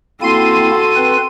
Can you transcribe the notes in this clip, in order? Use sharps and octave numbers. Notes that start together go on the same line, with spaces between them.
A#3 C4 E4 F#4 A4 C6 D#7
C4 B4